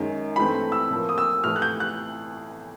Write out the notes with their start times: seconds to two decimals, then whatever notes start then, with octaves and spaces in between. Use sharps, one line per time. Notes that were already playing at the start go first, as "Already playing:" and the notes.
Already playing: F#2 D#3 G#3
0.36 G2 E3 A3 C4 B5
0.72 E6
0.90 A2 F3 A#3
1.09 D#6
1.18 E6
1.44 A2 E3 A3 F6
1.56 F#6
1.62 G6
1.80 F#6